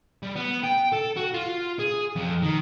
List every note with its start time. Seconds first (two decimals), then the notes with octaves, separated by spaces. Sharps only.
0.23 G3
0.36 B3
0.64 G5
0.93 A4
1.17 F#4
1.34 F4
1.79 G#4
2.16 F2
2.42 D#3